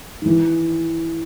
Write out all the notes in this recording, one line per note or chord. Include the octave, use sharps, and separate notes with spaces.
D#3
E3